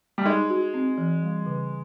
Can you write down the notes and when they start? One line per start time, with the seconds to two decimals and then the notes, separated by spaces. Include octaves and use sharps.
0.18 G3
0.26 G#3 D#4
0.50 F#4
0.74 C4
0.98 E3
1.23 G3
1.46 C#3